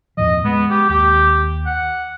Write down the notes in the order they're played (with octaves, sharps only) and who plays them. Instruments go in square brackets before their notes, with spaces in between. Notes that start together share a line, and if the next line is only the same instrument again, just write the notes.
[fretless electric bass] E2 A2 F3 [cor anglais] D#5
[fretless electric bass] G#3 [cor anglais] B3
[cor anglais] G4
[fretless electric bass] D#2 [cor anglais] G4
[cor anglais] F#5